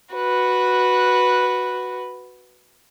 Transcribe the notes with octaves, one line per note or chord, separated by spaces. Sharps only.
F#4 B4